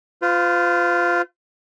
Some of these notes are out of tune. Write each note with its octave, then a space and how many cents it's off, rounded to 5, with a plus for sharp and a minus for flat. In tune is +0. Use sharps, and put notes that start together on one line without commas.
F4 +0 C5 -45